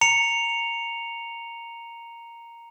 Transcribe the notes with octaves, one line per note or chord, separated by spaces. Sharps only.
A#5 C#7 F7